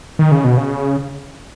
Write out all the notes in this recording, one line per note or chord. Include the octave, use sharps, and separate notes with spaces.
D#3
C#3
B2
C#3